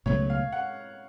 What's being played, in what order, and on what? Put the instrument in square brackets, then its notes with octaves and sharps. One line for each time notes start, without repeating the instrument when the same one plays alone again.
[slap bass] C#2 B2 F#3 A3 [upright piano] C#5
[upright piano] F5
F#5